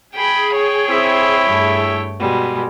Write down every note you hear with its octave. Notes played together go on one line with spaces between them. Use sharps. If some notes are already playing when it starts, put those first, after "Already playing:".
G#4 G5 B5
C#5 G5
C4 E4
G2 A3
B2 G3 G#3